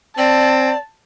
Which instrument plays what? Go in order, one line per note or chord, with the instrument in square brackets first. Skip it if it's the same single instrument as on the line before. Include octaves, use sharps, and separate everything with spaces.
[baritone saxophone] C4 [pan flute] D5 [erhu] A5